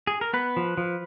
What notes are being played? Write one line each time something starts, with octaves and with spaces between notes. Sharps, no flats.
G#4
A#4
B3 B4
F3
F3